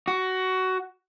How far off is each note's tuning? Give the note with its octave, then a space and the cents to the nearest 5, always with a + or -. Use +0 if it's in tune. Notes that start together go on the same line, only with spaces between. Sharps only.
F#4 +15